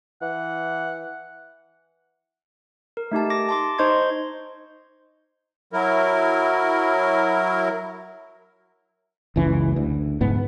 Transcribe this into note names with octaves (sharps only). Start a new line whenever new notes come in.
E3 F#5
A#4
A3 D#4 G4 A5
D6 A#6
A5 C6 D6
D#4 C5 D#5 C6 C#6 G#6
F#3 E4 A#4
F#1 C#2 E3 C#4
D2
F1 D2 G#2 B3